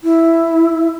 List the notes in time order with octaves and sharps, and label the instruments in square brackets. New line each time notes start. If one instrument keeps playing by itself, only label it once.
[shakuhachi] E4